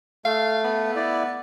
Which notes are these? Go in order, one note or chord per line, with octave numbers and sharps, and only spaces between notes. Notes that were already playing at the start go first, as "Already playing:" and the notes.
A3 F5
B3
E4 D5